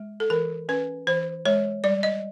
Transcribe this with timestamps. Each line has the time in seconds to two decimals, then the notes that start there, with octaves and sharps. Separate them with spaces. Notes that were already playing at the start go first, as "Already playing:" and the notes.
Already playing: G#3
0.20 A4
0.30 E3 A#4
0.69 C#4 B4
1.07 E3 C5
1.46 G#3 C#5
1.84 G3 D5
2.03 D#5